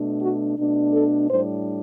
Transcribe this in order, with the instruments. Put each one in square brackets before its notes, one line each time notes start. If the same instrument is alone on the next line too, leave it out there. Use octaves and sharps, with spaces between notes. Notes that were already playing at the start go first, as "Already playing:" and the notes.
Already playing: [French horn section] B2 A3 D4
F#4
B2 A3 D4
A4
A2 G3 D4 C5